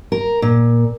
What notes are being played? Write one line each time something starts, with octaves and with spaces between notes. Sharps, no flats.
A#4
A#2